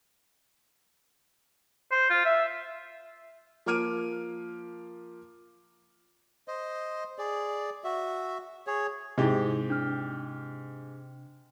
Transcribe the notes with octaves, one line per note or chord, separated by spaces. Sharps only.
C5
F4
E5
F3 A#3 D6 F6 D7 D#7
C5 D#5
G#4 D5
F#4 E5
G#4 C#5
G#2 C3 D#4 E4 G4
D4 F6